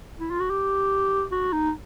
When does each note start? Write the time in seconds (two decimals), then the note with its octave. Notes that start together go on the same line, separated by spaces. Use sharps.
0.20 E4
0.31 F4
0.40 F#4
0.50 G4
1.32 F#4
1.53 D#4